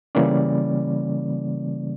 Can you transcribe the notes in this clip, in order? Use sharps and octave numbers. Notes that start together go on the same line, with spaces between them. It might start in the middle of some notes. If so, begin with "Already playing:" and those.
C#3 E3 G3 A#3 C#4 D5